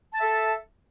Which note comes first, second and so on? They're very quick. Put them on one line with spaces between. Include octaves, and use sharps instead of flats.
A5 E5 A4